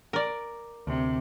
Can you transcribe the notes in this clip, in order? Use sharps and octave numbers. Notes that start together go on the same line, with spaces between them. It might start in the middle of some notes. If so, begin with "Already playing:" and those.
A#4 D5
D2 C3